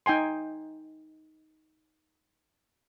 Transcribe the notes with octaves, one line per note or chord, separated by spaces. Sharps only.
D#4 G5 G#5 C6